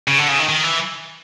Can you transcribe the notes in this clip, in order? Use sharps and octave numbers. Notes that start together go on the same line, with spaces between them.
C#3
D3
C#3
D#3
D#3
E3